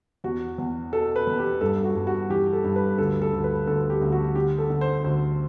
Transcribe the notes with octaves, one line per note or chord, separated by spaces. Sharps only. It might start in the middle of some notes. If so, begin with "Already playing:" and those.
E2 F#4
E2
B2 A4
B4
E2
G4
G2 A4
F#4
G2
F#4
E3 G4
A4
G2
B4
D2 A4
A4
D2
B4
D2 A4
G4
D2
F#4
D3 G4
A4
D3
C5
D2 C5